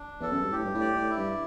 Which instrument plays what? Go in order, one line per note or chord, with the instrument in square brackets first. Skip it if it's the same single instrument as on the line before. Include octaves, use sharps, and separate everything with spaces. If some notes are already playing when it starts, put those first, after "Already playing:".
Already playing: [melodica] D4
[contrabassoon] E2 [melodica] A4
[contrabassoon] F#2
G2
[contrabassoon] A2 [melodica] G4
[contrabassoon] G2
A2
[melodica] D5
[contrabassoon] A2
[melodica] E4
[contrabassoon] G2